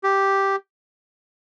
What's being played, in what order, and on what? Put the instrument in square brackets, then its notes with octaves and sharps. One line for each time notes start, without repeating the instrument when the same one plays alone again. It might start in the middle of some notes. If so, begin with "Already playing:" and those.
[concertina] G4